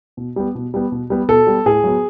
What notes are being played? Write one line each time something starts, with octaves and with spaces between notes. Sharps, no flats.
B2
G3 B3
B2
G3 B3
B2
G3 B3
B2 A4
G3 B3
A2 G#4
F#3 B3